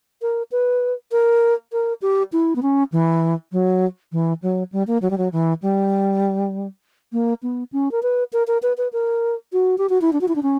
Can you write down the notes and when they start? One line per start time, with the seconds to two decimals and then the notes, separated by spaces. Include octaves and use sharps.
0.22 A#4
0.52 B4
1.12 A#4
1.72 A#4
2.02 G4
2.33 E4
2.56 B3
2.62 C#4
2.92 E3
3.52 F#3
4.12 E3
4.42 F#3
4.72 G3
4.87 A#3
5.02 F#3
5.10 G3
5.18 F#3
5.32 E3
5.62 G3
7.13 A#3
7.43 B3
7.72 C#4
7.92 A#4
8.03 B4
8.33 A#4
8.47 A#4
8.63 B4
8.78 B4
8.93 A#4
9.53 F#4
9.78 G4
9.89 F#4
10.01 E4
10.13 D4
10.21 F#4
10.28 E4
10.36 D4
10.43 C#4